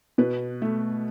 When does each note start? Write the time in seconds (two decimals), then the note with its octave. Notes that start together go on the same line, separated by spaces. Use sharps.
0.18 B2 B4
0.62 A3